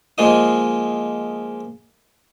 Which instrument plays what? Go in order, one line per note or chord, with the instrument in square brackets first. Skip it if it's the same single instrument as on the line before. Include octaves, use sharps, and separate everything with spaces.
[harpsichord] F3 G#3 A#3 F4 D#5 D#6